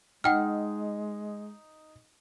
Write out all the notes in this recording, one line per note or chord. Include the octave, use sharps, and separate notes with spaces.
G#3 D#4 F#5 G5 F6